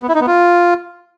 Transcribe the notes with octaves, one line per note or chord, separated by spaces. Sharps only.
B3
E4
D#4
B3
F4